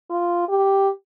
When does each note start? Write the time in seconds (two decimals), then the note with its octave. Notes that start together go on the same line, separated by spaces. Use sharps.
0.10 F4
0.49 G4